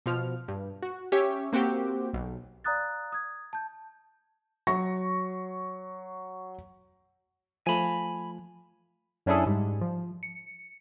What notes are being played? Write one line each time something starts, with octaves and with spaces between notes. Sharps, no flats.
B2 F3 F6
G2
F#4
C#4 G4 C#5 E5
A#3 C4 F#4 G4
B1
D5 F5 A#5 D#6 F#6 A6
D#6 G#6
A5 G6
F#3 C#6 A#6
F3 A3 G#5 B5
F#2 C#4 D4 E4 G#4 A4
G#2 G3
F3
C#7